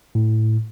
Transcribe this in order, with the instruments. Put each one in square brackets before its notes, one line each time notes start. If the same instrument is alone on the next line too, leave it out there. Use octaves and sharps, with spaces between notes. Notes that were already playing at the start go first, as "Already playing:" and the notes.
[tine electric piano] A2